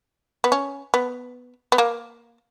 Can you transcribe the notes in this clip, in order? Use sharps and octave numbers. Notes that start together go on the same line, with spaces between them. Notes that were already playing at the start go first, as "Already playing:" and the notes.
B3
C#4
B3
B3
A#3